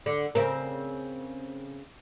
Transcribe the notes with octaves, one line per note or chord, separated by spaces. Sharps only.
D3
C#3 C4 A#4